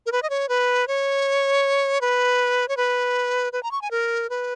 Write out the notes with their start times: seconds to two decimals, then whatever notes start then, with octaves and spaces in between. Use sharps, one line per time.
0.06 A#4
0.12 B4
0.23 D#5
0.30 C#5
0.49 B4
0.88 C#5
2.01 B4
2.68 C#5
2.77 B4
3.53 B4
3.63 A#5
3.72 C#6
3.82 G#5
3.91 A#4
4.30 B4